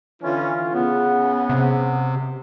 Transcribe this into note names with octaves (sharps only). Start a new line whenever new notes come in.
D3 E3 C#4 F4
C#3 B3 F#5
C3